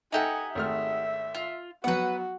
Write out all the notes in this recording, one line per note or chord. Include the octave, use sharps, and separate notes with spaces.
D#4 G4 A4 D#5 E5 F#5 G#5
G#1 A3 E5 F6
F4
F#3 B3 F#4 B4 F#5